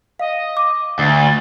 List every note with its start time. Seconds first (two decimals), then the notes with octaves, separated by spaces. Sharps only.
0.19 D#5 F5
0.57 D6
0.99 D2 A6